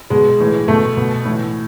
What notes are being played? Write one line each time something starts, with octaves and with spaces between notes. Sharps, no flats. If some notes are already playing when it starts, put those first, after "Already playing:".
B2 G#3
A2 E3
B2 A3
B2
A2 E3